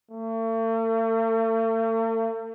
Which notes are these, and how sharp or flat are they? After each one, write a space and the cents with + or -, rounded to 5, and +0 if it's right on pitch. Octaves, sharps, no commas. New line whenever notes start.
A3 +45